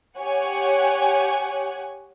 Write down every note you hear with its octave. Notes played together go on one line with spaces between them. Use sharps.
G4 C#5 F#5 G#5